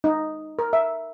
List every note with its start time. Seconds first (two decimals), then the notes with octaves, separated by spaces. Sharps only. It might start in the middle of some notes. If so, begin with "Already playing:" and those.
0.04 D#4
0.59 A#4
0.73 E5